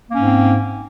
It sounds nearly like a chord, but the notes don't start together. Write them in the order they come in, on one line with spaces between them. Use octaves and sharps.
A#3 C#4 G#2 C4